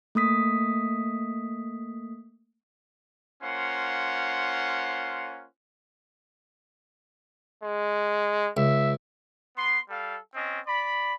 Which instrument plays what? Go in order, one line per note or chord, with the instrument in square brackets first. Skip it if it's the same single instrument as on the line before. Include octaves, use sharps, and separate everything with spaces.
[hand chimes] A3 A#3 D#6 B6
[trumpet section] A#3 C#4 F4 C5 F#5
[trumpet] G#3
[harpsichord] C#2 [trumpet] E5
[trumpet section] B3 C6
G3 A4 F5
C4 C#4 D#5
D5 B5